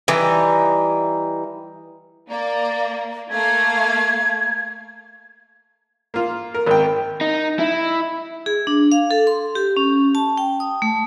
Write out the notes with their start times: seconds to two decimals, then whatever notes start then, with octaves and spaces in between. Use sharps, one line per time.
0.08 E3 G3 D#4
2.29 A#3 D5
3.30 A3 A#3 F5 G#6
6.14 A#3 F4
6.54 A#4
6.66 G#1 A#4 G5
7.21 D#4
7.59 E4
8.46 G#4
8.67 D4
8.92 F5
9.11 A4
9.27 C6
9.55 G4
9.77 C#4
10.15 A5
10.38 G5
10.60 D#6
10.82 A3